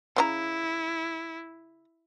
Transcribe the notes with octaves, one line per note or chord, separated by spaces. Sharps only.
C#3 C4 E4 A#5